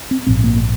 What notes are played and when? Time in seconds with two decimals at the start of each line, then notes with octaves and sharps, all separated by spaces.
0.11 C4
0.26 A#1 G#2 C4
0.44 A#3